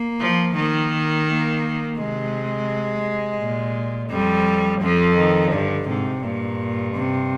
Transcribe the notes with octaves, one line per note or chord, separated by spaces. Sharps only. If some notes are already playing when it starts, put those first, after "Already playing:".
Already playing: A#3
F3
D#3 A#3
A#3
C3 G#3
A#2
F2 G3
F2 F3
D#3
G2 D3
G#2 C3
G2 A#2
C3